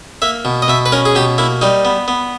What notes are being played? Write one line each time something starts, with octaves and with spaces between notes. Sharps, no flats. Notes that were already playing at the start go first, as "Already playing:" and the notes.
A#3 E5
B2
D#5
B2 E5
B4
C#4 A#4
G#4
B2 G4
A#3 E4
G3 D#4
B3
B3